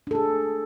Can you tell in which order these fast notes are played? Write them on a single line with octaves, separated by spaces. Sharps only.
D4 A4 G#4